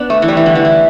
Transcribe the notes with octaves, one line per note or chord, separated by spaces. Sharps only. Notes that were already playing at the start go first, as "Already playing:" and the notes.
Already playing: B3 D4
A3
E3
G3
E3
D3
E3
E4